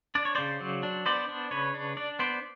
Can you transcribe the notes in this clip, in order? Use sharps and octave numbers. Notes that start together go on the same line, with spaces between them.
D4 D5
C#5
C#3 C5 D5
F#3
D4
B3 C5 D5
D4
C#3 B4 C#5
D4
D4 D5
B3 C5 D5